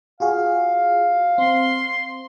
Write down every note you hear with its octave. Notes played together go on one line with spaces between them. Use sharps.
F4 F#4 G#4 F5
C4 C6